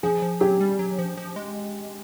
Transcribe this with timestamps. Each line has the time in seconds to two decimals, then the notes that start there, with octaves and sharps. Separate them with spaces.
0.03 F3 G#4
0.22 F3
0.41 F#3 G4
0.61 G3
0.79 F#3
0.99 F3
1.18 F3
1.36 G#3